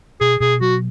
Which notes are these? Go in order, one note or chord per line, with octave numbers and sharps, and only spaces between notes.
B2 G#4
B2 G#4
F#3 F#4